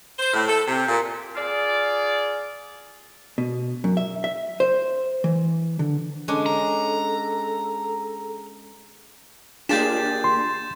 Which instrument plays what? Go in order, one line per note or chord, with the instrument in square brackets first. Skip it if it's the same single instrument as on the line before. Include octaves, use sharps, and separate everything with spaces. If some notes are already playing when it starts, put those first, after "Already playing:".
[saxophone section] C5
A2
A4
C3
A#2
[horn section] F4 G#4 D5
[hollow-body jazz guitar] B2
F#2
E5
E5
C5
E3
D3
[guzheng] G#3 C#4 D4 [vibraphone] G#4 [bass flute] A4
[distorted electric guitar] A#5
[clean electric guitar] A#3 G4 [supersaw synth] D4 F4 G#4 [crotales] G6 A6 E7
[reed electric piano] C6